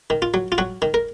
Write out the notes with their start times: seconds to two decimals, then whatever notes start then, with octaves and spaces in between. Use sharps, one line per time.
0.10 D#3
0.22 F4
0.34 F#3
0.52 F4
0.58 F#3 F#4
0.82 D#3
0.94 A#4